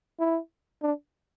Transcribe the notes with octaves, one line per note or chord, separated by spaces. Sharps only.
E4
D4